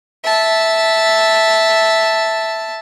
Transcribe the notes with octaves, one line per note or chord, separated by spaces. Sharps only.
E5 A5